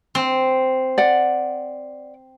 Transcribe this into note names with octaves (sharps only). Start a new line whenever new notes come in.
C4
D5 F#5